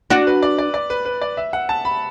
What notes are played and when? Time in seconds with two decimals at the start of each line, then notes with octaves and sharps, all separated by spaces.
0.10 D4 F#4 D5
0.27 B4
0.43 D5
0.58 D5
0.74 D5
0.90 B4
1.05 B4
1.21 D5
1.37 E5
1.53 F#5
1.69 A5
1.85 B5